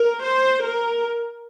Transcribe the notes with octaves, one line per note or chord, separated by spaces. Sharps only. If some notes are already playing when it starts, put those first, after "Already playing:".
Already playing: A#4
C5
A#4